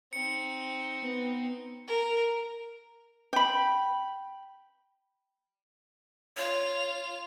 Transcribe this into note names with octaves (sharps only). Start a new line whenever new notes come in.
C4 D#4 C#7
B3
A#4
G5 B5
F4 C#5 F7